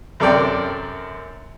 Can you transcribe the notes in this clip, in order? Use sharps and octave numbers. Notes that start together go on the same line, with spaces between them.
F#2 C3 A4 A#4 D5 G5